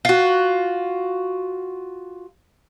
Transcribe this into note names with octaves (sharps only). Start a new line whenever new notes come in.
F4 F#4